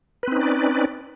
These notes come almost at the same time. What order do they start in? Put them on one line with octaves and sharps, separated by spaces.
B4 C4 D#4 C#4 D5